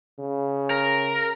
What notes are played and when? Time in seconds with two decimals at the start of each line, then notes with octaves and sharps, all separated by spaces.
0.19 C#3
0.70 A#4